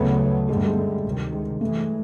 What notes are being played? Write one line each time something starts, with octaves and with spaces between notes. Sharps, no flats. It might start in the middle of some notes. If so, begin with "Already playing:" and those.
Already playing: D2 C#3 F#3 A3 B3
G2 D3 G3 G#3
A3
G#3
A3
D2 C3 D#3
G#3
G2 E3 G#3 A3